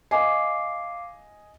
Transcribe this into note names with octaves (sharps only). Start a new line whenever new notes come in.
D#5 F5 G#5 D6 C7